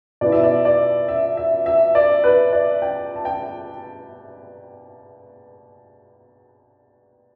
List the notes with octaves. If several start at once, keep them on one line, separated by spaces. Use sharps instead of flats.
B2 B3 E4 D5
E5
D5
D5
E5
E5
E5
D5
B4
D5
G5
A5
G5